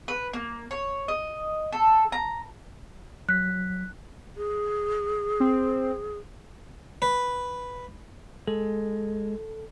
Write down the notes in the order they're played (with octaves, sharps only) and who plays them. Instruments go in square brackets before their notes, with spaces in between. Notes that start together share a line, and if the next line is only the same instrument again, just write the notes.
[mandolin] B4
A#3
C#5
D#5
A4
A#5
[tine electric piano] F#3 B6 [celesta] F#6
[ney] G#4
[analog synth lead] C4
[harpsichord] B4
[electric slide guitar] G#3 [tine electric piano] A4